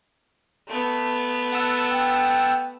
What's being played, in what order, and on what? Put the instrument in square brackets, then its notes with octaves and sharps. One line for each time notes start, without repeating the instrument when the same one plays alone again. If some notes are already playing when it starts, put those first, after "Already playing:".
[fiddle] A3 B3
[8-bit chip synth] F#5 A5 E6
[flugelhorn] G5